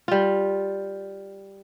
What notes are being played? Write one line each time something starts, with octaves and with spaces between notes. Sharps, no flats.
G3 F4